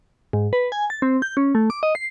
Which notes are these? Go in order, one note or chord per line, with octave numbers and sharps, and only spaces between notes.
G#2
B4
G#5
A6
C4
G6
C#4
A3
D6
D#5
C7